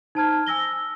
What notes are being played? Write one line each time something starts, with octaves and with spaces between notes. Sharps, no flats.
D#4 C5 A5 A#5 F6 G#6
G#5 E6 A#6 G7